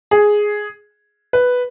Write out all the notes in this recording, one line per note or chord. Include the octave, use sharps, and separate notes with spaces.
G#4
B4